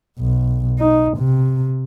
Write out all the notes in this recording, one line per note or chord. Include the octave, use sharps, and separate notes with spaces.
B1
D#4
C3